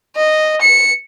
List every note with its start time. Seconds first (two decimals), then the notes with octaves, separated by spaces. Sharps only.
0.16 D#5
0.61 C#7